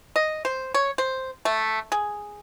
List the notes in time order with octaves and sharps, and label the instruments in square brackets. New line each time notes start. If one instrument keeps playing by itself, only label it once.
[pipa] D#5
C5
C#5
C5
A3
G#4